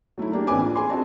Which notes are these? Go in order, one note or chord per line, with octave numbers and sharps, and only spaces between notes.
F#3 A3 D#4 E4
A#3 D4 G4 G#4
A1 C4 D4 B4 G#5 D6
F4
G#4 G#5 C6 D6
C4 D4 F#4 D#5 A5